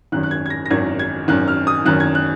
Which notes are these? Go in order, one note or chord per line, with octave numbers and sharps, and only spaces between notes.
G#1 F#2 D#3 F#6
F#6
G#6
G#6
A#6
A#6
G#1 F#2 D#3 G#6
G#6
G#1 F#2 D#3 F#6
F6
D#6
G#1 F#2 D#3 F#6
G#6
F#6